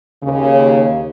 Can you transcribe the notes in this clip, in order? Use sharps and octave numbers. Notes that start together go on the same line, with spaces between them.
D#2 C#3